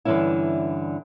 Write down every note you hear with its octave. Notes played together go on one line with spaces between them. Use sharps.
G2 D3 E3 F3 C#4 E4